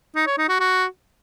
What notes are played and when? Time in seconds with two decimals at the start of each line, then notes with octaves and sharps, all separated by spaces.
0.16 D#4
0.27 C#5
0.38 D#4
0.49 F#4
0.60 F#4